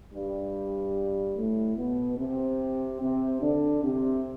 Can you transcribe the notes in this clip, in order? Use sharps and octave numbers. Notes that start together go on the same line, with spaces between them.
G2 G3
A2 A3
B2 B3
C3 C4
C3 C4
D3 D4
C3 C4